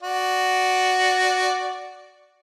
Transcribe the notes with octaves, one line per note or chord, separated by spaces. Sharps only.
F#4 D5